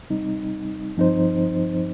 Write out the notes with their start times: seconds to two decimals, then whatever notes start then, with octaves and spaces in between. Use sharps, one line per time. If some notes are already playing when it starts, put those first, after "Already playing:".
0.10 C3 G3 C4 D#4
0.97 G2 F3 C4 D#4 C5